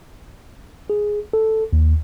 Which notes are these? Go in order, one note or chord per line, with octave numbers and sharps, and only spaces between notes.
G#4
A4
D#2